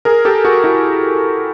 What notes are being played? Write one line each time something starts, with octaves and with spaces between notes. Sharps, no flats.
G#4 A#4
G4 A4
F#4 G#4
E4 F#4